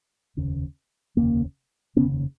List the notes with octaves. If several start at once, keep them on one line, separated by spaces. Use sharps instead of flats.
F1 D#2 C#3
F1 D#2 C#3 A#3
F1 D#2 C#3 B3 C#4